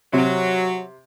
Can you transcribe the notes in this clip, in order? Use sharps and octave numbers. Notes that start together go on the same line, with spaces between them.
C3 F#3